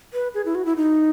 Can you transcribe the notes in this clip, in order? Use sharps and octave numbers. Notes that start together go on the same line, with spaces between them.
B4
G#4
E4
F#4
E4
D#4